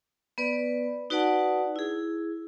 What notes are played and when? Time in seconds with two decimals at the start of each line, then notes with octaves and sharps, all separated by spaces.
0.38 B3 B4 D5
1.10 D#4 F#4 B4 D5 F#5 A5
1.76 E4 G#4